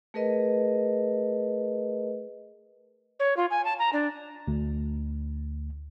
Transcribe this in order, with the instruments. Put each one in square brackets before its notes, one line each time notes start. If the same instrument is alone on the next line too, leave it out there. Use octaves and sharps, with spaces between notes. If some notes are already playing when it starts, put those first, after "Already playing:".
[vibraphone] A3 G#4 A#4 B4 D#5
[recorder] C#5
F4
G#5
A5
A#5
D4
[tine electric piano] D2